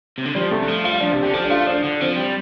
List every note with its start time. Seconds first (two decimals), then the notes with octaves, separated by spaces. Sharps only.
0.18 C3
0.25 D3
0.35 F3 G3
0.51 C3 A3
0.63 D3
0.68 F3
0.84 G3 F4
1.01 F3 D4
1.12 C3 G4
1.23 D3 G4
1.30 A4
1.34 F3 G4
1.44 D4
1.50 A3 F4
1.67 F3 D4
1.84 D3
2.01 F3 C4
2.17 G3